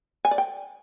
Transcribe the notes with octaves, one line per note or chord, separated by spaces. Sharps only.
G#5
D5
G5